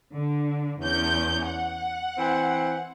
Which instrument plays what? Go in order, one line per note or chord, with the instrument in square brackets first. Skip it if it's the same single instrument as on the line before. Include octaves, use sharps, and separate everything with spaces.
[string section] D3
E2 C#4 G6
F#5
[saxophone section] E3 C4